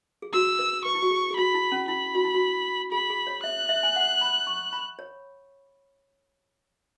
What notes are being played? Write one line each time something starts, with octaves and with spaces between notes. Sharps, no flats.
G#4
F#4 E6
B4
B4 C#6
E4
F#4
G#4
G#4
F#4 B5
E4
C#4
E4 B5
F#4
E4
F#4
G#4 B5
G#4
C#5
E5 F#6
E5
G#5
F#5
B5
C#6
B5
C#5